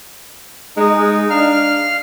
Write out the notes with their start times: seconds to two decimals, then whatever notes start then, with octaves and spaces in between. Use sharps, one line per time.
0.77 G#3 D#4
0.98 G#3
1.30 D4 F5 F6